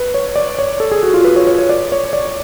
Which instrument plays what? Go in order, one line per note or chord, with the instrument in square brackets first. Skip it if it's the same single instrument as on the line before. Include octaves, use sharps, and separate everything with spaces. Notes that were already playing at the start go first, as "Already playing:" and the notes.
Already playing: [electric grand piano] B4
C#5
D5
C#5
A4
G#4
F#4
F4
B4
C#5
C#5
C#5
D5
C#5
D5